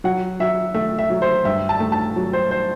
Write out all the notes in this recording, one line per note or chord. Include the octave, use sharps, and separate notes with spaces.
F#3 F#5
F#3 E5
A3 E5
E5
F#3
C5
G2 E5
A5
A3
A5
F#3
C5
C5